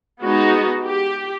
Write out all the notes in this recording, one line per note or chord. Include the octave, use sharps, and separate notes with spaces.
G#3 B3 D#4 F#4
G4